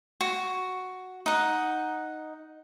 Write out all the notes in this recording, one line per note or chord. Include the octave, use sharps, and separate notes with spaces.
F#4
D#4 F#5